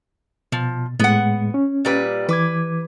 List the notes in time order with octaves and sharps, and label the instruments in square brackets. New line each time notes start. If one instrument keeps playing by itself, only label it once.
[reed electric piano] B2 [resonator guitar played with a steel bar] F3
[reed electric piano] A2 G#3 [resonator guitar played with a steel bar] B3 F#5
[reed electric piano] C#4
[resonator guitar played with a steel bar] A#2 G3 B4
[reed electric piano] E3 D6 G#6 [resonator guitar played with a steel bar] B4